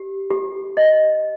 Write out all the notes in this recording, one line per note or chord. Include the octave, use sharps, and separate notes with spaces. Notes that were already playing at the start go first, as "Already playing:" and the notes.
Already playing: G4
G4
D#5